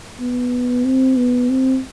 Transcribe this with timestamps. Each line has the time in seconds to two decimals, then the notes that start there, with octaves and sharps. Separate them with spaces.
0.20 B3
0.85 C4
1.17 B3
1.50 C4